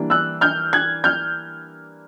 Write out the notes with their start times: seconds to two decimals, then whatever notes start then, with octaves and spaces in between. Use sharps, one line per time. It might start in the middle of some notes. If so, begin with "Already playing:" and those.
Already playing: E3 G3 A#3 D4
0.10 E6 F#6
0.41 F6 G6
0.73 F#6 G#6
1.04 F6 G6